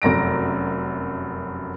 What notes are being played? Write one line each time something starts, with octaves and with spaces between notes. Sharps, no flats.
F1 F#2 A#6 D7